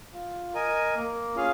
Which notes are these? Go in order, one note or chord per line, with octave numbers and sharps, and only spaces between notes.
F4
A#4 D#5 G#5
A#3
C#4 F4 G#4 F5